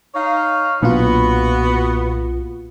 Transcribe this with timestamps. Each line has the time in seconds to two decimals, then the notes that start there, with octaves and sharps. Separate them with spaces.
0.15 D#4 C#5 F5
0.82 B1 A#2 A#3 B3 D4 F4 F#4